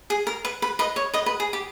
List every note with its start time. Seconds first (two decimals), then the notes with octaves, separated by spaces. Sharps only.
0.10 G#4
0.27 A#4
0.45 B4
0.62 B4
0.79 B4 D#5
0.96 C#5
1.14 B4 D#5
1.26 B4
1.40 G#4
1.53 G4